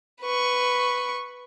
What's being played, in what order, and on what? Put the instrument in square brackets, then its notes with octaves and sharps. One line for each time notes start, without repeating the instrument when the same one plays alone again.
[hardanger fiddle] B4 C#6